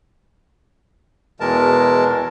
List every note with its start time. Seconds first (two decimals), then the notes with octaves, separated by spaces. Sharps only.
1.40 E2 B2 E3 G#3 A#4 A5